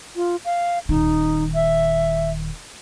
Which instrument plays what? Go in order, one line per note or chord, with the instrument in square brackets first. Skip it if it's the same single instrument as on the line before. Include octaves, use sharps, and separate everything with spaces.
[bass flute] F4
F5
[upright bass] D#1 D#3 [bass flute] D#4
[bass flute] E5